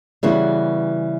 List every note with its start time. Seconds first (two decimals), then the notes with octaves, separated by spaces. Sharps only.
0.23 C#3 E3 G3 B3 F#4